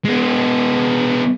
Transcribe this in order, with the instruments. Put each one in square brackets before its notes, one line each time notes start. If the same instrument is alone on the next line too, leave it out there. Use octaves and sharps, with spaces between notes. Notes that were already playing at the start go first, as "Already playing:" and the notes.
[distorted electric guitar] G#3 B3